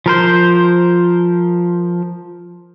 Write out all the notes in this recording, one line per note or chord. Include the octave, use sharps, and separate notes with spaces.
F3 A#4 C5